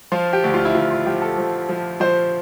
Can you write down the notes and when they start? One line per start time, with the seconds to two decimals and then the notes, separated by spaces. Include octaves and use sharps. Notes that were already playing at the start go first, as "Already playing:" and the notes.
0.12 F3 F4
0.33 G4
0.44 D2
0.54 F4
0.65 E4
0.74 D2 F4
0.91 F4
1.06 F3 G4
1.22 A4
1.38 F3
1.69 F3
2.00 F3 C5